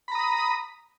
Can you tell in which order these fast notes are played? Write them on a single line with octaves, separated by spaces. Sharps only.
B5 A#5 D#6